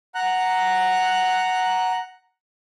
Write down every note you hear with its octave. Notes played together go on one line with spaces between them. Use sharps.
F#5 A#5 F#6